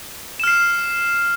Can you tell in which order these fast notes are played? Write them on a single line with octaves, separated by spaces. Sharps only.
E7 F6 C7